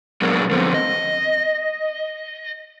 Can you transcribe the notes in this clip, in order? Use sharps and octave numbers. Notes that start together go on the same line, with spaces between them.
A#2 F#3 G#3 A#3 B3 D4
D3 F3 B3 C4
D#5